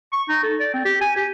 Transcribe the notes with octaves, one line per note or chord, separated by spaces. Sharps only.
C#6
D#4
A4
D5
C4
G4
G#5
G4